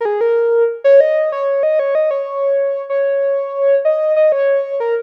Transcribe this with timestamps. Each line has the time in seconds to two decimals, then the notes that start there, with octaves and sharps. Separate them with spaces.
0.01 A#4
0.05 G#4
0.21 A#4
0.84 C#5
1.01 D#5
1.32 C#5
1.63 D#5
1.79 C#5
1.95 D#5
2.11 C#5
2.90 C#5
3.85 D#5
4.16 D#5
4.32 C#5
4.80 A#4